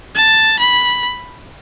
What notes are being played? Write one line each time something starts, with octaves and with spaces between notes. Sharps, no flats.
A5
B5